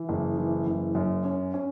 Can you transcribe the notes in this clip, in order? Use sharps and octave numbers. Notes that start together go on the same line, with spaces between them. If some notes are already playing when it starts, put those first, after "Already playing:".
Already playing: E3
F#1
E3
F#1
F#2
C#4
C#4